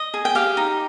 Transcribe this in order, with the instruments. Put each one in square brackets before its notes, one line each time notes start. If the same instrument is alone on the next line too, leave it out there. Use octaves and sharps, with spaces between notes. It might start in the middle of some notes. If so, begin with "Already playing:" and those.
Already playing: [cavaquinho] D#5
G#4
G5
G4 F5
D#4